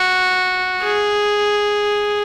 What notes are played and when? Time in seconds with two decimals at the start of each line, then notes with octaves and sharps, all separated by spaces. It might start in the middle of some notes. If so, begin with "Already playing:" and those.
Already playing: F#4
0.83 G#4